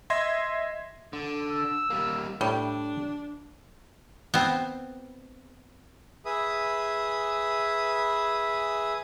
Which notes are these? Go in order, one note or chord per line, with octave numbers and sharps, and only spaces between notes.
D#5 E5 C6 G#6 A#6 C7
D3
E6
G3 A#3
A2 G3 D4
B3 C4
G#4 B4 E5 D#6